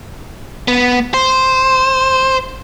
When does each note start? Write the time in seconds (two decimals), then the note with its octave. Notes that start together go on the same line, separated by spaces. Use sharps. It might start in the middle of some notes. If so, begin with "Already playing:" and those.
0.68 B3
1.14 C5